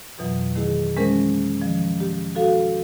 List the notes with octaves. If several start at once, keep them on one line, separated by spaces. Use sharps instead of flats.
F2 B2 E3 F#3
D#3 A3 E4 G#4
E3 G#3 A3 C#4 A#4 C5
D#3 F3
G4
F#4 A4 F5